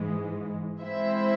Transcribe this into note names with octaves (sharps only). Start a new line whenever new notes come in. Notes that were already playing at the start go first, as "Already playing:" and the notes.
Already playing: G#2 E3 G#3
G#3 C4 E4 C5 E5